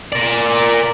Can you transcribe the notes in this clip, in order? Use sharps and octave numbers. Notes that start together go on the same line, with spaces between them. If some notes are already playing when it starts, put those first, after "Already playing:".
A#4 D5